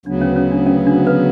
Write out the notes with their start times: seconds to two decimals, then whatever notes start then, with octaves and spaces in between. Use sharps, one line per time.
0.06 D2 C#3 F#3 B3 D4
0.21 C#4
0.36 C#4
0.51 D4
0.66 C#4
0.87 D4
1.07 B4